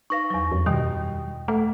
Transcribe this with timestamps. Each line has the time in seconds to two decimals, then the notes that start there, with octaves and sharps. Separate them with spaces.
0.10 D#4 B4 F5 C#6 A#6
0.30 E2 F#3
0.51 F2
0.66 F#2 B2 D#3 G3 G5
1.48 A3 F#5